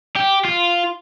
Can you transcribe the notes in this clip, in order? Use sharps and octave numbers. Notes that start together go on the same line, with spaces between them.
G4
F4